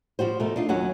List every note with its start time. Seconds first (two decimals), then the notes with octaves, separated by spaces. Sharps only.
0.19 F3 G3 F#4 C5
0.40 B2 A3 A#4
0.56 D4 D#4 F4
0.68 D#2 F#3 C#4 F#5 G#5